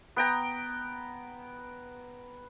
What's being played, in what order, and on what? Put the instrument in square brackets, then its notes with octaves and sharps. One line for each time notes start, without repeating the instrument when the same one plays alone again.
[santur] B3 G5 A#5